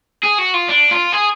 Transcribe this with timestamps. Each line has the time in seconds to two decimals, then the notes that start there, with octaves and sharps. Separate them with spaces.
0.23 G#4
0.38 F#4
0.54 F4
0.69 D4
0.91 F4
1.13 G#4